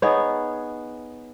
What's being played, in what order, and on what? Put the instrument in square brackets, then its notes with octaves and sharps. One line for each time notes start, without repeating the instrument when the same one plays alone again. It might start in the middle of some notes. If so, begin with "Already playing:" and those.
[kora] B3 D#4 G#4 C#5